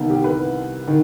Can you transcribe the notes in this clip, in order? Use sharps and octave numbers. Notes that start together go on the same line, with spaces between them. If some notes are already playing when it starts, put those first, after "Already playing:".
Already playing: C2 C3 D#3 B3
G4
B4
D#3